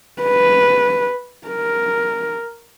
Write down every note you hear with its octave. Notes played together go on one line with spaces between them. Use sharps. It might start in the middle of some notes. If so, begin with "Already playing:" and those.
B4
A#4